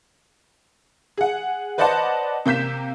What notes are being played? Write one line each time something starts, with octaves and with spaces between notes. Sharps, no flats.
G#4 F#5
B4 C5 D5 D#5 F#5 A5
C3 A#3 G6 B6 E7